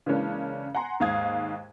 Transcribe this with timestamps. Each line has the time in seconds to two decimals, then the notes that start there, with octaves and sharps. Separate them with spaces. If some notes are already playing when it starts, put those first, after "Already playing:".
0.06 C#3 E3 G#3 A#3 C#4 D4
0.75 F#5 G#5 A#5 C6
1.00 D#2 G#2 F5 D#6 G#6